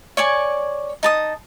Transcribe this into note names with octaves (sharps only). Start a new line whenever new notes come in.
C#5 D5 G#5 C#6
D#4 A5 D#6